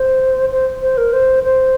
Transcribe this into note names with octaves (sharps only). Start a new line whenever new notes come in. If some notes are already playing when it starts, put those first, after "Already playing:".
Already playing: C5
C5
C5
A#4
C5
C5